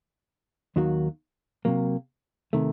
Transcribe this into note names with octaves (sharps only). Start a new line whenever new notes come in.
D#2 D#3 F#3 A#3 F#4
C3 D#3 F#3 A#3
C3 D#3 A3